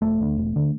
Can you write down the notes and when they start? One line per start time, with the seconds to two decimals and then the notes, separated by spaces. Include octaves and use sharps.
0.02 E1 A3
0.20 D2 D3
0.38 E1
0.56 D3